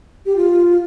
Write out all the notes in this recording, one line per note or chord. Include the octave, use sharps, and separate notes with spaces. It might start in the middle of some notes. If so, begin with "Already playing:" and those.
G4
F4